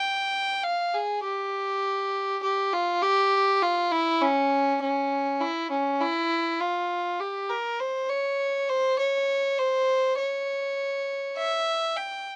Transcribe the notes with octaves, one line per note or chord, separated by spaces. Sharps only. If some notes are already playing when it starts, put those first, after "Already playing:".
Already playing: G5
F5
G#4
G4
G4
F4
G4
F4
E4
C#4
C#4
E4
C#4
E4
F4
G4
A#4
C5
C#5
C5
C#5
C5
C#5
E5
G5